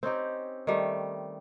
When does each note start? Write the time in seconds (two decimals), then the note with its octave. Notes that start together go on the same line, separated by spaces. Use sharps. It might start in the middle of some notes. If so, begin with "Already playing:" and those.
0.03 C4 C#4 D#4 G4
0.67 D#3 G3 A3